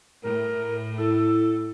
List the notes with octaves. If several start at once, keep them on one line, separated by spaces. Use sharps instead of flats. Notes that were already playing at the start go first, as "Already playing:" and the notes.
A2 A#4
E4 A4